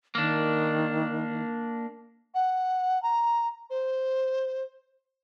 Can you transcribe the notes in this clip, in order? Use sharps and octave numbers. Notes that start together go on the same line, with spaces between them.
D#3 A#3 D4
F#5
A#5
C5